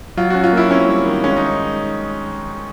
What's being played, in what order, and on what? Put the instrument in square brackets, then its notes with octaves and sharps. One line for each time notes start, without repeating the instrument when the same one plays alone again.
[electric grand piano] F#3 [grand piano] F4
[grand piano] F#4
[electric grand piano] C#4
[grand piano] F4
[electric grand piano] A#3 [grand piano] E4
[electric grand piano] C4 [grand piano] C#4
[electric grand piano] G3
D#3
[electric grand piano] G#3 [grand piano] C#4
[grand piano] D#4